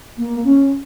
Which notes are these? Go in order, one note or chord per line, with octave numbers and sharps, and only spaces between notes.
A#3
C#4